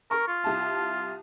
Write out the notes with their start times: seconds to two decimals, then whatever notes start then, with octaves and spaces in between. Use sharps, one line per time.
0.11 A#4 C#6
0.28 F4
0.44 C2 A5